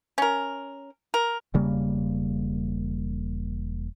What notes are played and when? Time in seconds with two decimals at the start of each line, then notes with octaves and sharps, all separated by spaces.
0.18 C#4 A#4
1.14 A#4
1.54 E1 C#3 G3 A#3